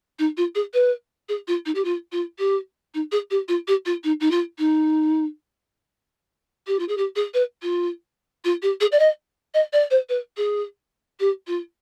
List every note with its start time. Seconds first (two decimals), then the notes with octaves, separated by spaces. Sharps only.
0.19 D#4
0.37 F4
0.55 G#4
0.74 B4
1.29 G#4
1.47 F4
1.65 D#4
1.75 G4
1.84 F4
2.12 F4
2.38 G4
2.94 D#4
3.12 G#4
3.30 G4
3.48 F4
3.67 G4
3.86 F4
4.04 D#4
4.20 D#4
4.31 F4
4.58 D#4
6.67 G4
6.79 F4
6.88 G#4
6.97 G4
7.16 G#4
7.34 B4
7.62 F4
8.44 F4
8.62 G4
8.81 G#4
8.92 D5
8.99 D#5
9.54 D#5
9.73 D5
9.90 C5
10.09 B4
10.37 G#4
11.20 G4
11.47 F4